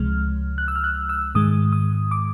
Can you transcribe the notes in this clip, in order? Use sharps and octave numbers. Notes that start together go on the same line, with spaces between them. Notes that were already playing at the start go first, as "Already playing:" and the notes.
Already playing: C#2 C3 F3 G#3 F6
F#6
E6
F6
F#6
E6
G#2 D#3 G#3 D#6
D#6
D6